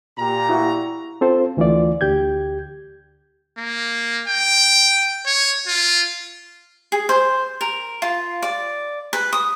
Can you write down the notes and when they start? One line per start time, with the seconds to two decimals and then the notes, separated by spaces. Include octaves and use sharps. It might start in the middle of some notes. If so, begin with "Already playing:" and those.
0.18 A#2 G4 A#5
0.49 E4 F#4
1.21 C4 F4 A4 C5
1.57 D2 E3 A3 F4 D5
2.01 D2 G4 G6 G#6
3.58 A#3
4.28 G5
5.26 C#5
5.67 F4
6.92 G#4
7.09 C5
7.61 A#4
8.02 F4
8.42 D5
9.13 B4
9.33 D#6